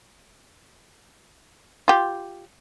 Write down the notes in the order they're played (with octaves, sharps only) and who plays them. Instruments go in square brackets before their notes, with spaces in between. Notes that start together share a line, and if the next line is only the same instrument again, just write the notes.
[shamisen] F4 G4